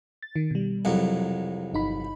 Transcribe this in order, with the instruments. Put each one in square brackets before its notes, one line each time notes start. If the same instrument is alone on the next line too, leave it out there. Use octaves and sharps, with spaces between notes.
[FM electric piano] A6
D#3
B2 G3
[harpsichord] C2 F2 F#3
[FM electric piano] G1 D#4 B5